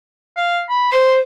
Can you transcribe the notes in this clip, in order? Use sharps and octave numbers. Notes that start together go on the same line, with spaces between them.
F5
B5
C5 C6